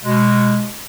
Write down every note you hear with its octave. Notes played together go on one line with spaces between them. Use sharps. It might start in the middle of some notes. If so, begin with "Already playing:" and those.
B2 G#3